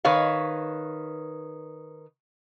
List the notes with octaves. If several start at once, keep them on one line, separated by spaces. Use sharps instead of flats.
D#3 B4 C#5 F5